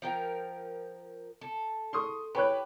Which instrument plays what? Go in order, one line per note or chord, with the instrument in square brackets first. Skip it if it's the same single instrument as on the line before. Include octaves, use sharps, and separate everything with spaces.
[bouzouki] F3 A#4 G5
A4
[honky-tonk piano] C6 C#6 D#6
[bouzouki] G4 [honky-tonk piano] B4 C#5 F#6